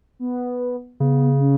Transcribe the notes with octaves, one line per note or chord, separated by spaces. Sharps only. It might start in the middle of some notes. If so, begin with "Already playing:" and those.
B3
C#3 B3
C#4